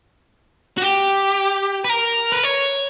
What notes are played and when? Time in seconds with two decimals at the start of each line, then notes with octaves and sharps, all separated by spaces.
0.78 F#4
0.82 G4
1.84 B4
1.89 A#4
2.32 B4
2.43 C#5